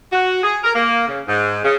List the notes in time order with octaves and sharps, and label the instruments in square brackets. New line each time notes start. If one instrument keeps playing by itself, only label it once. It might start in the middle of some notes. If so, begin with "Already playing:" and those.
[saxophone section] F#4
G#4
A#4
A#3
C#3
G#2
C#3